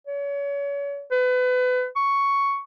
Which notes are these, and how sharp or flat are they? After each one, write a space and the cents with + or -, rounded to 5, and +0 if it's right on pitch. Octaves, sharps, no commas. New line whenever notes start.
C#5 +35
B4 +30
C#6 +5